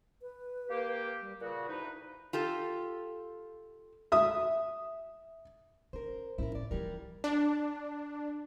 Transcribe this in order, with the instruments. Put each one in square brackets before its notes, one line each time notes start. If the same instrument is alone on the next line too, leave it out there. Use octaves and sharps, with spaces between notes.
[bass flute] B4
[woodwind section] A#3 G4
[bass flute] G3
[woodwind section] A#2 C#3 F#4 [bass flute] B4
[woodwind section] D2 D#4 B4 [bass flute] E4
[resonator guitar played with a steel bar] F4 G4 A4
[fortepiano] E5 D#6
[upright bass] C#4 [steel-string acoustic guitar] A#4 C5
[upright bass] A2 C#4 [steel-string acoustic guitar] E4 A#4
[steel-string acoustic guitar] D5
[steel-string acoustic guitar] E3 G3 A#4 [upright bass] F3 F4
[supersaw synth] D4